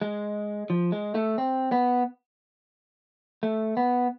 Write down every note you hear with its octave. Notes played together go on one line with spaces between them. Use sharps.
G#3
F3
G#3
A3
C4
B3
A3
B3